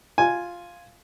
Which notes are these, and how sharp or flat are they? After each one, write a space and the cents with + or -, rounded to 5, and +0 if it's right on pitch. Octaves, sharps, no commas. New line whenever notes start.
F4 +0 G#5 +0